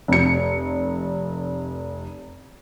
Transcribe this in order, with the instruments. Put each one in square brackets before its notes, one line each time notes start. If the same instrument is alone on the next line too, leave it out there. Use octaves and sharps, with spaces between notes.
[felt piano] F1 C#7